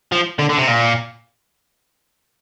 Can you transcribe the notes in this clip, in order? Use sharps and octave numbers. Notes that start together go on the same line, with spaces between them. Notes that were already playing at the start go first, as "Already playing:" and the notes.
F3
D3
D3
C3
A#2